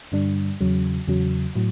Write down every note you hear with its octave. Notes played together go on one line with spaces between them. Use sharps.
G2 D3 G3 D4
E2 C#3 F#3
E2 C#3 F#3
A2 F#3